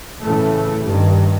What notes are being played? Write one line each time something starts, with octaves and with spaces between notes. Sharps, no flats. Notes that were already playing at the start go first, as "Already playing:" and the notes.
A2 C#3 E3 A3
G2 D#3